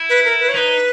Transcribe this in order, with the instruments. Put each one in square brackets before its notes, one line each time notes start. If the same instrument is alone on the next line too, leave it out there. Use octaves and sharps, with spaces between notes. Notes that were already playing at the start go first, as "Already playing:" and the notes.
Already playing: [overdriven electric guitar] E4
[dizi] B4
A#4
B4
C#5
[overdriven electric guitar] D#4 [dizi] B4